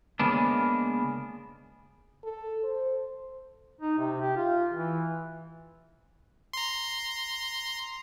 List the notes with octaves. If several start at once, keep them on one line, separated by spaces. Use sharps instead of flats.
C#3 G#3 A#3 B3 D4
A4
C5
D#4
C3
G4
F4
E3
A#5 C6